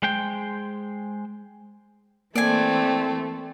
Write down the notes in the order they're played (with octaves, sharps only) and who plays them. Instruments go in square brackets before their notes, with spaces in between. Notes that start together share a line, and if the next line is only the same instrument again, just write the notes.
[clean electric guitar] G#3 C5 G5
[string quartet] E3 A3 C4 [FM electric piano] A#3 [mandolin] D5 G#5